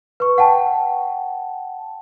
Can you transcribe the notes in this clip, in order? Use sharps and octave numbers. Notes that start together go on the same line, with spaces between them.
B4 C#6
F#5 G5 A5